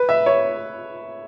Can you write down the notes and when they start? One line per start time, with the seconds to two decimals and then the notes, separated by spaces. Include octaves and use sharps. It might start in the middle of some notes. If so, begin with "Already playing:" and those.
Already playing: B4
0.09 E5
0.26 C#5